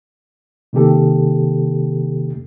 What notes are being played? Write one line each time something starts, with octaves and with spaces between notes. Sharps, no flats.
C3 D#3 A#3 G4 A4